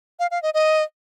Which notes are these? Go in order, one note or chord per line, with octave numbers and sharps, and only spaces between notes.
F5
F5
D#5
D#5